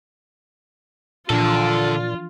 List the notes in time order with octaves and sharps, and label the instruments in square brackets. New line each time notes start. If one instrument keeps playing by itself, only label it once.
[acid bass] A#2 [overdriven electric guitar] D3 A4 [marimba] E3 F3 D4 [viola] F4